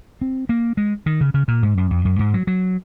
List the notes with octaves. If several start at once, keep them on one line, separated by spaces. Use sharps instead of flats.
C4
A#3
G#3
D#3
C#3
C#3
A#2
G#2
F#2
F2
F#2
G#2
F#3
F#3